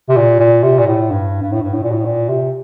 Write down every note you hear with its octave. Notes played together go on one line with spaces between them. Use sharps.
C3
A#2
A#2
C3
A#2
A2
G2
G2
A2
G2
A2
A#2
A2
A#2
C3